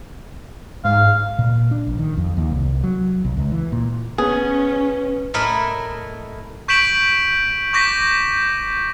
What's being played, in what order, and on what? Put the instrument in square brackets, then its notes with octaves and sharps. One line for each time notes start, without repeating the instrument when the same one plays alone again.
[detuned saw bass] G#2 [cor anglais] F5
[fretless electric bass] A#2
D4
A#1
D#3
F2
D#2
C2
F#3
B1
C#2
E3
A#2
[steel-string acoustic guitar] B3 [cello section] C#4 [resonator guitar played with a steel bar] G#4
[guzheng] A2 A3 E4 A#4 D#5 B5
[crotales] C#6 G6 B6 D7 E7 F#7
C#6 D6 G6 A#6 B6